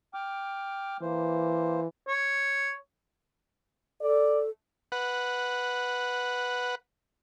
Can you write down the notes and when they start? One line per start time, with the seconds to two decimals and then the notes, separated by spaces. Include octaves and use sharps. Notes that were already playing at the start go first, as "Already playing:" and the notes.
0.14 G5 D6 F6
1.02 E3 A#3 C5
2.08 C#5
4.02 A4 D5
4.92 B4 F#5